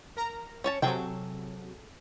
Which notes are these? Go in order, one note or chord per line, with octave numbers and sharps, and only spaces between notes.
A#4 A#5
C#4 C#5 A5
C3 F#3 G#4 A4 G5